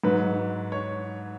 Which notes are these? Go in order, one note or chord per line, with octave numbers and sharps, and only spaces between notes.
G#2 F#3 B4
C#5